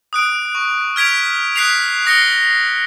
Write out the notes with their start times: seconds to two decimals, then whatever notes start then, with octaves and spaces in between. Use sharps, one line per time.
0.13 D#6 F#6 D7
0.55 C#6
0.96 F6 G#6 B6 D7 F7
1.56 D#6 F#6 B6 C7 D7 F7
2.06 D#6 A#6 C7 C#7 G7